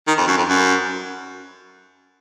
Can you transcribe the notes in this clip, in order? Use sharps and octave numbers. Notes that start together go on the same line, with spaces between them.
D#3
F2
F#2
F2
F#2